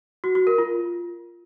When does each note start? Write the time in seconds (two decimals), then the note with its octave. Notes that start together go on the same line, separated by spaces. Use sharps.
0.24 F#4
0.35 F#4
0.47 A#4
0.58 F4